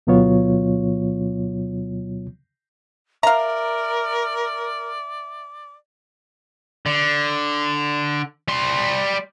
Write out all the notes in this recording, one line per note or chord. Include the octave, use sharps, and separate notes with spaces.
D2 B2 F#3 B3 F4 C#5
A#4 D5 E5 F5 A#5
D3
G3 C6